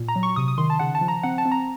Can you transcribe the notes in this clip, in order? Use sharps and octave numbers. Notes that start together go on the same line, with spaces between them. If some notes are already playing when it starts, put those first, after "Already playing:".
Already playing: A#2
A#5
F#3
C#6
C3 D#6
D#6
D#3 C6
A5
C#3 F#5
A5
F3
A#5
C4 F#5
A5
C4
A#5